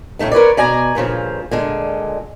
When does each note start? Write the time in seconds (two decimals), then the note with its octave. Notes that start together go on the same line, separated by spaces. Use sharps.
0.19 A2 C#3 A3 D#4
0.31 A#4 B4 C#5 D5
0.57 B2 D5 G#5 A#5
0.95 G2 A#2 C#3 F3
1.51 A#2 D3 G#3